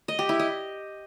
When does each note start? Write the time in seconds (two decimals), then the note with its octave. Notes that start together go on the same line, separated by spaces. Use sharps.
0.08 D#5
0.19 G4
0.29 E4
0.39 D#5